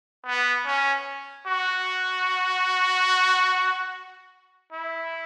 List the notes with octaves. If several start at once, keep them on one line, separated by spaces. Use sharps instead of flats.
B3
C#4
F#4
E4